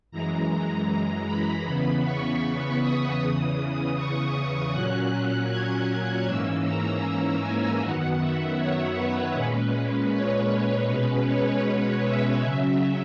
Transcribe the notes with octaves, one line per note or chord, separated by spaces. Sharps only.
F#2 E3 G#3 A#5
A#5
B5
E2 C#3 E3 B3 B5
C#6
D#6
E2 C#3 E3 D#6
C#6
D#6
A#2 F#3 C#4 F#6
G#6
F#6
G#2 E3 A#3 C#4 E6
A#5
A#5
G#5
F#2 D#3 F#3 B3 F#5
E5
C#5
B4
A#2 G#3 C#4
C#5
B2 G#3 C#4 B4
C#5
E5
C#3 F#3 C#4